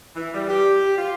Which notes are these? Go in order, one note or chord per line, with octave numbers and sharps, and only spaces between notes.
E3
G3
G4
F4